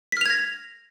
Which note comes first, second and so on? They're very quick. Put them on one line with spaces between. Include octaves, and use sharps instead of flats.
B6 F6 F7 G#6 A#6